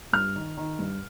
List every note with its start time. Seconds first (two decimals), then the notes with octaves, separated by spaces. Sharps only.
0.13 G2 F6
0.36 D#3
0.57 D#3
0.79 G2